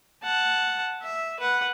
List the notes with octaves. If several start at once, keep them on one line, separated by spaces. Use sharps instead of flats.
F#5 A5
E5
B4 F#5